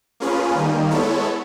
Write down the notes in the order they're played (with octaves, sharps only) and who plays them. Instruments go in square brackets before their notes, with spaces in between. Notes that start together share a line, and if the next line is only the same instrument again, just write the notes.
[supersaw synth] A#3 C#4 F4 G#4 B4
D#3 G3 A#3 D#4
G#3 B3 E4 A4 C#5